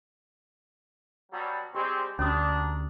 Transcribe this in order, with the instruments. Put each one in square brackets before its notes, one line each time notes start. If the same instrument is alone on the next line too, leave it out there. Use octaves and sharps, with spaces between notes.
[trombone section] B2 F#3 G3
[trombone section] G3 G#3 C4 [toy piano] G4
[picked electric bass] D2 [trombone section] D#3 G3 D4 [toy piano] C#4 F#4 D#6